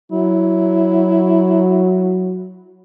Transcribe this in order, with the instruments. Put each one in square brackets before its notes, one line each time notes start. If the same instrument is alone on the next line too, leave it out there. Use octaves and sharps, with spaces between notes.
[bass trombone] F#3 [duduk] E4